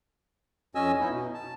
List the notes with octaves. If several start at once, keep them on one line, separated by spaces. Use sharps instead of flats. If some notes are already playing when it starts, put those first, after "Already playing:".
F2 C#4 D#5 G#5 E6
B3 D#4 E4
B2
A5